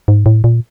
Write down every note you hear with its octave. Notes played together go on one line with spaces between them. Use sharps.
G#2
A2
A#2